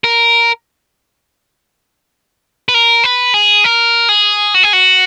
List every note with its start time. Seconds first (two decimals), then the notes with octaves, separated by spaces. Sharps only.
0.04 A#4
2.69 B4
2.74 A#4
3.04 B4
3.34 G#4
3.64 A#4
4.09 G#4
4.54 F#4
4.63 G#4
4.73 F#4